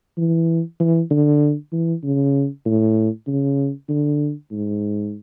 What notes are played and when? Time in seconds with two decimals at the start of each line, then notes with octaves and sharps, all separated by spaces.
0.17 E3
0.80 E3
1.11 D3
1.72 E3
2.03 C#3
2.66 A2
3.27 C#3
3.89 D3
4.51 G#2